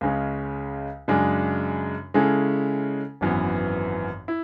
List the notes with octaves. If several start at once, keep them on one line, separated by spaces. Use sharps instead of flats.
C#2 C#3 G#3 C#4
F#2 C#3 G#3 D4
C#3 G#3 C#4 E4 A4
G#1 F#2 E3 B3
E4